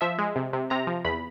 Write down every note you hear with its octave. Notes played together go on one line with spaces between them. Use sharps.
F3 E5
G#3
C3
C3
C3 A#5
F3
E2 B5